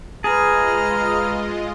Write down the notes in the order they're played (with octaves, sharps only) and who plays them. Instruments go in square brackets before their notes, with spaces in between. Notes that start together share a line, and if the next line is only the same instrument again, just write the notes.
[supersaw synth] G#3 F4 D#5 [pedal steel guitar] G#4 [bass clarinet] B4 [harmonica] A#5 F6